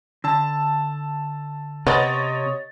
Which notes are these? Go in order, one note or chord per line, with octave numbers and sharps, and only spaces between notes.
D3 A5 E6
C3 B3 C4 C#5 D#5 A6